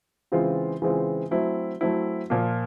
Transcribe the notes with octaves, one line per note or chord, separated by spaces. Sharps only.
C#3 E3 G#3 C4 F4
C#3 E3 G#3 C4 F4
F#3 A3 C4 E4
F#3 A3 C4 E4
A#2 F3 A#3